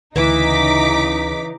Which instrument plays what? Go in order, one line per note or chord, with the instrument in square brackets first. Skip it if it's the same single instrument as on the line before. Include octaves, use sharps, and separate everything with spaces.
[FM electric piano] D2 E4 [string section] C#3 D#4 [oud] E3 [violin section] D6 B6